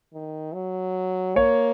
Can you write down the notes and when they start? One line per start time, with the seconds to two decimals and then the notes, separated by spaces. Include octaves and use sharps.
0.13 D#3
0.54 F#3
1.36 A#3 C#5